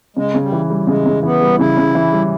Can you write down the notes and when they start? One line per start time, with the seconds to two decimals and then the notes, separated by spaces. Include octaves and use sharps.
0.16 C#3 G#3
0.35 C#3
0.41 G3
0.52 E3
0.70 G3
0.87 C#3 G#3
1.06 C#3
1.23 E3 B3
1.41 G3
1.58 C#3 E4
1.77 C#3
1.95 E3
2.12 G3